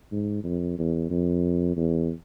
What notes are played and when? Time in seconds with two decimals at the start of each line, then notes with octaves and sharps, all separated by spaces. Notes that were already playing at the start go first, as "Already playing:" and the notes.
0.12 G#2
0.44 F2
0.78 E2
1.10 F2
1.77 E2